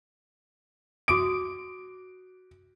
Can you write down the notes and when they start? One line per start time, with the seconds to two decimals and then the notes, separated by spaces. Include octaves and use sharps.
1.08 F#4 D6 D#6 D7